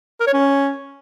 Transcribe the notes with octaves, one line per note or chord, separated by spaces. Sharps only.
A#4
C#5
C#4